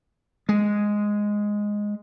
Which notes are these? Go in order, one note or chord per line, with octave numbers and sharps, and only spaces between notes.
G#3